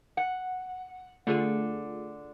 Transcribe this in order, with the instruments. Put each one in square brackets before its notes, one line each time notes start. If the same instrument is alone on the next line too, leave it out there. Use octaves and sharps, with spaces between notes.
[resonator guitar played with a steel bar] F#5
[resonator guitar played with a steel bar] D3 [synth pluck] A3 F4 G#4